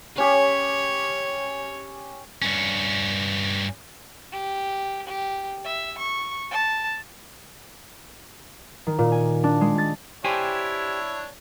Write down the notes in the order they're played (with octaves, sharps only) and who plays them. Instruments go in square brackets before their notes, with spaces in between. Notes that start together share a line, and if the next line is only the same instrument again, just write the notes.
[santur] C#4 G4 [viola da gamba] C#5
[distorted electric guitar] G2 C#4
[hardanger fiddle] G4
G4
E5
C#6
A5
[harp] D#3
A#2
G#5
D4
G#3
A6
[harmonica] D4 C#5 [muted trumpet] E4 [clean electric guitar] G4 C5 G#5